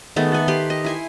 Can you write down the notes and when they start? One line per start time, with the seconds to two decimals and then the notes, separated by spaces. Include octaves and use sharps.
0.16 D#3 G#3 A3 B3
0.32 A4 F#5 G#5
0.48 G4 B4 C6
0.70 D#5
0.85 E4 G#5 C6